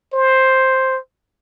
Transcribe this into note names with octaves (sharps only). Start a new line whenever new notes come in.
C5